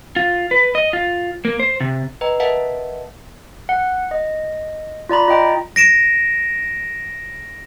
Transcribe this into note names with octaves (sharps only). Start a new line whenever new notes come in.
F4
B4
D#5
F4
A#3
C5
C3
B4 D#5 G5 A#5
A#4 B4 D#5 E5 F#5 A5
F#5
D#5
F4 D5 A#5 B5
F4 D#5 G5 A#5
A#6 D7 E7